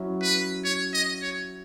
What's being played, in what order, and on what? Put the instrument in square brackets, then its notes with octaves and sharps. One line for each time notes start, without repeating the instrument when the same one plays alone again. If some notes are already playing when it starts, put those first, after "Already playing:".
Already playing: [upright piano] F#3 C#4 E4
[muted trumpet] B4
C#5
D#5
C#5